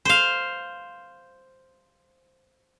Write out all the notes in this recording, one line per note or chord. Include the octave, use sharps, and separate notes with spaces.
C5 F5